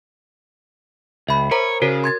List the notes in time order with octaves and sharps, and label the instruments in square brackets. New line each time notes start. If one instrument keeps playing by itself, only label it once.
[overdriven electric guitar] C#2 [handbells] E5 B5
[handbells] A#4 C5 A#5 [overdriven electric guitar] C#5
[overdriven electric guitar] C#3 [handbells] F#4 A#4 C#5
[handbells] C6 G#6 A6